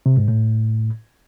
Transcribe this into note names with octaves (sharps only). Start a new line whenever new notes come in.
C3
G#2
A2